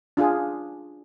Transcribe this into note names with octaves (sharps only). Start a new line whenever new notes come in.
D4 F4 G#4